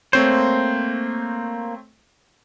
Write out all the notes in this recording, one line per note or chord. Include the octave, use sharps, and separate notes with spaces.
A3 A#3 C4 C5 C#5